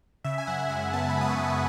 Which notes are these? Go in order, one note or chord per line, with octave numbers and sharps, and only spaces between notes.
C#3 E5
G#5
F#2 F#5
G#3 G#5
B3 A5
B5
C#3
D#6
C#6
F#2